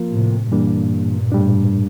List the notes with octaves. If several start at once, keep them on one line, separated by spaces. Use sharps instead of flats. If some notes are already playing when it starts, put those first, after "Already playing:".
Already playing: F3 A#3 F4 A#4
A2 C3
G2 A#2 E3 G3 A#3 D4
A2 G3 D4